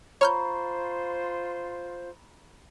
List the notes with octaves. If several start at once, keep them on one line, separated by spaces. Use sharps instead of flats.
F4 C5 C#5 A#5 B5 C#6 F6 G6